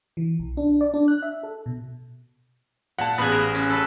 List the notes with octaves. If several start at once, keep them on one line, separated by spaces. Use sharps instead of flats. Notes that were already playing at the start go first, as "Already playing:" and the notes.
E3
B1
D4
D5
D4
F#6
E5
A4
B2
A#2 F#5 A5
A1 B3 G#4 B5 F#6
A#4
C#4
A4 B4